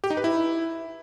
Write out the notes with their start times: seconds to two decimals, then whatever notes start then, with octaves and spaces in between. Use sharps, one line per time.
0.04 G4
0.10 D#4
0.17 B4
0.24 E4